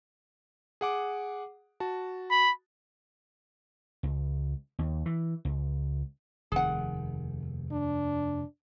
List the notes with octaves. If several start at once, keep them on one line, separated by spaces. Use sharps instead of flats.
G#4 F#5 D6
F#4 A5
B5
C#2
D#2
E3
C#2
F1 D#2 D#3 G#4 F#5
D4